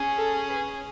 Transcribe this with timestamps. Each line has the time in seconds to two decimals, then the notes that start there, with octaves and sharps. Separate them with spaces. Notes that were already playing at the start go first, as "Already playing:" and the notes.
Already playing: C#4 G#4
0.18 A4
0.48 B4